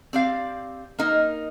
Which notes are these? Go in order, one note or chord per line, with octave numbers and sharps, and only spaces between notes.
C4 G4 D5 F5
A#3 D#4 A#4 D#5